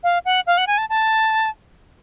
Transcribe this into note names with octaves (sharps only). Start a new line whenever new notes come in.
F5
F#5
F5
F#5
G#5
A5
A5